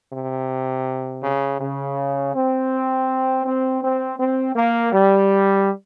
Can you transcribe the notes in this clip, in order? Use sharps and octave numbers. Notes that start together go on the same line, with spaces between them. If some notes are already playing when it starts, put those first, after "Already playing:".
C3
C#3
C#3
C4
C4
C4
C4
A#3
G3